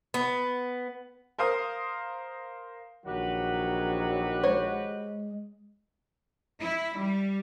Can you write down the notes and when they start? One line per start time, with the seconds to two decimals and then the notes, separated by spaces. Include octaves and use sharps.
0.14 B3
1.38 A#4 C5 F5 D#6
3.06 A#1 D#3 F#3 F#4 G4 B4
4.43 G#3 C5 C#5
6.61 E4
6.98 G3